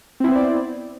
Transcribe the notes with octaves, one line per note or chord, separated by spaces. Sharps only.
B3 C4 E4 C5 D5